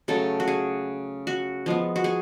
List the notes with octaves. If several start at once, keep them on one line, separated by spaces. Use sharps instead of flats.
C#3 F#3 A3 A4
F#4
G#4
F#4
F3 G#3 B3
F#4
G#4